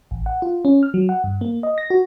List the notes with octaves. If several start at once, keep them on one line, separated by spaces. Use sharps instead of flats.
A1
F#5
F4
C#4
F6
F#3
F#5
G2
A#3
D#5
A#6
F#4